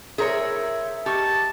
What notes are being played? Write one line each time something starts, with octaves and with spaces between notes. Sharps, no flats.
E4 G#4 A#4 C5 C#5 E5
D#4 G4 A5 C#6 F6